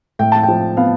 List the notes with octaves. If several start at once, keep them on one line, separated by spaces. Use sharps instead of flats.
A2 G5
A5
G5
F3
B3 F5